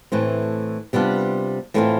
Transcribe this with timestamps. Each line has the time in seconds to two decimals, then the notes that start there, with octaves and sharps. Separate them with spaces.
0.12 A2 E3 A3 C4
0.93 C3 G3 B3 D4 F4
1.74 A2 E3 A3 C4 F4